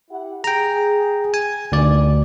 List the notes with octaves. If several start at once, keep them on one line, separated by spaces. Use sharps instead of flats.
E4 G4 F#5
G#4 G5 A#5
G#5
D2 G2 B2 D#3 D5